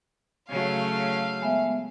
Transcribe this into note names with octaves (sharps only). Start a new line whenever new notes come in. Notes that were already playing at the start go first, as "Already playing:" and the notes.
C#3 F#3 A3 F5
G#3 B3 E5